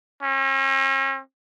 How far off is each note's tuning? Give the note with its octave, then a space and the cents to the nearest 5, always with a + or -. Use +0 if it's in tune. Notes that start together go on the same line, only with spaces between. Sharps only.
C#4 -45